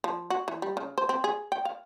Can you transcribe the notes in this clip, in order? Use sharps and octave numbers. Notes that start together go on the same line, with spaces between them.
F3
F#4
E3
G3
C#3
C5
C4
G#4
G5
F5